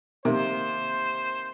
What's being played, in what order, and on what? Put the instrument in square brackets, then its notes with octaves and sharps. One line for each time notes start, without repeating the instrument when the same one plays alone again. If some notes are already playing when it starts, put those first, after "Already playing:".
[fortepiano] C3 D#3 A#3 [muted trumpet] C5